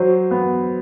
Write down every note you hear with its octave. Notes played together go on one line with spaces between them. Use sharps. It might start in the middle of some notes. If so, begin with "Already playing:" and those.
Already playing: F#3 C5
B3